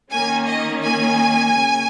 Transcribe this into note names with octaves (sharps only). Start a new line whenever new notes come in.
D#3 A#3 C#4 G#5
D#5
G#5
C#3 A#3 C#4